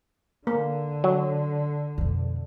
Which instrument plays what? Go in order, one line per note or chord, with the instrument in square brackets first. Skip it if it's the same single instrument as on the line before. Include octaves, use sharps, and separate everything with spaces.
[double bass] D3 [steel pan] A#3
[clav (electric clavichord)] F#3
[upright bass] F2 B2